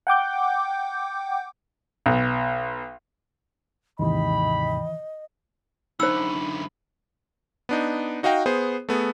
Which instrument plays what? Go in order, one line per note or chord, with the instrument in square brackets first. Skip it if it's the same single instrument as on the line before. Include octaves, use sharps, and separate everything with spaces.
[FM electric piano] F#5 G5 D6 G6
[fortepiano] B1
[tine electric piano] D#2 G#2 C3 [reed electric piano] D#3 E3 [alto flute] D#5 [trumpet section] G5 B5
[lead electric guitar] F#2 D3 [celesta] D#4 C#7 [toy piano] C5 E6 [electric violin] B5
[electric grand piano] B3 D4 D#4
D#4 F#4 D#5 F5 G5
B3 G#4 C5
A3 B3 G#4